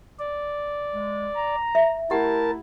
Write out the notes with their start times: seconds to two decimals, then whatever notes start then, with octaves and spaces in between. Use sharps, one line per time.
0.19 D5
0.94 G#3
1.36 A#5
1.75 E5
2.11 A3 E4 G4 A#4 F#5 A5